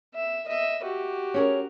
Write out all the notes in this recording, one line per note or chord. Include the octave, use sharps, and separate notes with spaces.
E5
D#5 E5
F#4 G4
C#4 G#4 A#4